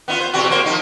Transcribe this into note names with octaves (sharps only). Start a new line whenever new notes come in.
B3 D#4 F4
C5
E2 C3 F#4
A2 A#3 C5
F3 D#4